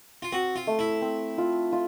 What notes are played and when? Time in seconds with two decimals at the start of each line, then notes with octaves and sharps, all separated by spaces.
0.22 F4
0.32 C4 F#4
0.56 F4
0.67 A3
0.79 E4
1.02 C4
1.38 F4
1.72 F4